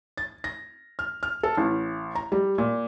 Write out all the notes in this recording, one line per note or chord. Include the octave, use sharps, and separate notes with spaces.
A6
A#6
F6
F6
A4
A1
A#5
G3
A#2